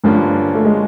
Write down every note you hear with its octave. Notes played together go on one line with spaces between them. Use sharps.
G2 D3 F3 G3 A#3 C#4
A3
G#3